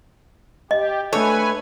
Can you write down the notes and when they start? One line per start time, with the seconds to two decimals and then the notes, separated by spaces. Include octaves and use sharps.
0.71 G4 D#5
1.13 A3 D4 A4 B4 C#5 G#5